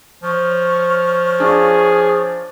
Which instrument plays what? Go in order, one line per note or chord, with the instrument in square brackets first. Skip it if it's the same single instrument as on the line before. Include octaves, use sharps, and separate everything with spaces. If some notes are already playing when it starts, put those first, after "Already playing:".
[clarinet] F3 [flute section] C#5 C#6 F6
[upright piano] D4 F4 [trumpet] G#4